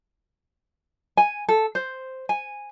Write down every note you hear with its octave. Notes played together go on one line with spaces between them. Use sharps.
G#5
A4
C5
G#5